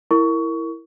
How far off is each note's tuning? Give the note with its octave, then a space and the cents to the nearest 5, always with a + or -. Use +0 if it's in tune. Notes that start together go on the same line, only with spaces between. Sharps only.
E4 +0 A#4 -10 C#6 +20